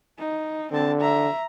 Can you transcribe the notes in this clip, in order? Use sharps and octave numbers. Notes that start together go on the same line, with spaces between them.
D#4
D3 C4 A5
E5 A#5